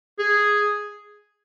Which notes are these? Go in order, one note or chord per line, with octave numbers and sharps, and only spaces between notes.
G#4